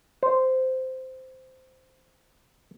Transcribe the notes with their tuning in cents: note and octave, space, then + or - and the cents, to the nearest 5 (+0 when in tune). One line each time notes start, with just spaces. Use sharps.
C5 -10